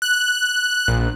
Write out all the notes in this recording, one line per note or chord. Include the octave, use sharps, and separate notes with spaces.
F#6
A#1